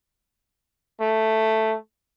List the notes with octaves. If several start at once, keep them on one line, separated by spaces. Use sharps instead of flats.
A3